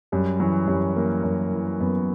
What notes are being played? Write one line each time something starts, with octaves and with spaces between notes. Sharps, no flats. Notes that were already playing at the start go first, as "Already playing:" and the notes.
F#2 G3
E3 F#3
F#2 G3
E3 A#3
F#2
E3
F#2 B3